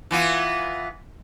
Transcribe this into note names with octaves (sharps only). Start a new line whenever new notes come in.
E3 B3 F4